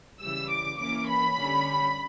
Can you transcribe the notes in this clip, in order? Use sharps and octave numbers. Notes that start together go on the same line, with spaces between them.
C#3 E3 G3 E6
D6
E3 A#3 C#4 D6
B5
D3 G3 C#4